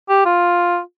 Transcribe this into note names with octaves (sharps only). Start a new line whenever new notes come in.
G4
F4